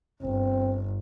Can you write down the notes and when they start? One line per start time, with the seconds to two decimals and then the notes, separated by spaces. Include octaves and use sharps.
0.23 G1 C4